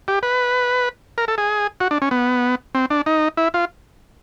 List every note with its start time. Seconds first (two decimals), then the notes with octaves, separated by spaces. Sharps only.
0.08 G4
0.23 B4
1.18 A#4
1.28 A4
1.38 G#4
1.80 F#4
1.91 D4
2.02 C#4
2.11 B3
2.75 C4
2.90 D4
3.06 D#4
3.37 E4
3.54 F4